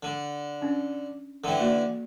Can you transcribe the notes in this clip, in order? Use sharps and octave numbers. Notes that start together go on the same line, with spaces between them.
D3
C#4 D4
D3 E3 A4 G5
A#3 F#4 D5